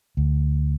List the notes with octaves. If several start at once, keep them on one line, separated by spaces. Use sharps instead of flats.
D2